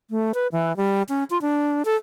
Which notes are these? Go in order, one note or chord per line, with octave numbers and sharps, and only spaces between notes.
A3
B4
E3
G3
C#4
F4
D4
A4